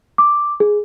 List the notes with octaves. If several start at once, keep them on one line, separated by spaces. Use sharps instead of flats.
D6
G#4